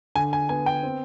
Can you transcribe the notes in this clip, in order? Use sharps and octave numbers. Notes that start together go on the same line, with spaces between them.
D3 G#5
G#5
B3 G#5
G5
C4